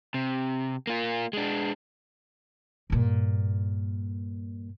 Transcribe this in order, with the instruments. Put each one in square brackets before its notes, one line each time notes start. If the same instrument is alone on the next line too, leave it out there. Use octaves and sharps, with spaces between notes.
[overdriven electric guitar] C3
A#3 F4
G#3 D4
[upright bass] G2 A#2